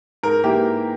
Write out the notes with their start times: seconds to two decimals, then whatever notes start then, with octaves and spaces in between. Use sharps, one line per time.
0.23 G#2 A#4
0.44 E3 A#3 E4 G4